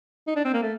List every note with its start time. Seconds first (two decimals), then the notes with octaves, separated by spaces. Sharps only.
0.27 D#4
0.36 D4
0.45 C4
0.53 A#3
0.62 A3